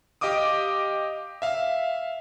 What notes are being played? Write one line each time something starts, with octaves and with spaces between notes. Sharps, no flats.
G4 D#5 F5 D6 D#6
E5 F5